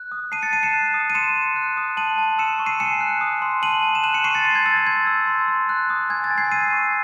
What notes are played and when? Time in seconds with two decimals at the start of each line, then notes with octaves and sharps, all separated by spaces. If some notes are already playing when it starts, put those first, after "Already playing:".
Already playing: F#6
0.12 D#6
0.32 A5 C7 D#7
0.42 A6 C#7
0.53 A5 C7 D#7
0.63 C#7 E7
0.74 F#6
0.94 D#6
1.10 D#7
1.15 C6 C#7 E7
1.36 C6
1.56 F#6
1.77 D#6
1.97 A5 D#7 F#7
2.18 A5
2.38 E6 C#7 E7
2.59 C#6
2.66 C7 D#7
2.80 G#5 C#7 E7
3.01 F#6
3.21 D#6
3.42 C6
3.62 A5 D#7 F#7
3.83 A5
3.95 E7
4.04 F#6 D#7 F#7
4.14 C#7 E7
4.24 C#6 C7 D#7
4.34 A6 C#7
4.45 C6 A6
4.55 G#6
4.66 E6 A6
4.77 A6
4.87 C6 G#6
5.07 E6
5.27 C6
5.48 C6
5.69 F#6
5.90 D#6
6.10 G#5 G#6
6.24 A6
6.31 G#5
6.38 G#6 C7
6.51 E6 C7 D#7
6.72 C#6